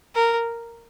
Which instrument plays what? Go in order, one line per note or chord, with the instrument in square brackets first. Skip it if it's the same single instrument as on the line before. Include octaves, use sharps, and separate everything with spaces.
[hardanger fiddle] A#4